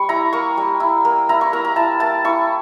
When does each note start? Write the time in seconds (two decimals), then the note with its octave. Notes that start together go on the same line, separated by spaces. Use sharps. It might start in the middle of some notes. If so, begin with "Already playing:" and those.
Already playing: G3 C#6
0.09 E4 A#5
0.33 A#3 C#6
0.57 G3
0.80 E4
1.05 A#3
1.29 E4 A#5
1.41 C#6
1.53 A#3 A#5
1.65 A#5
1.76 E4 A5
2.00 A#3 A5
2.25 E4 C#6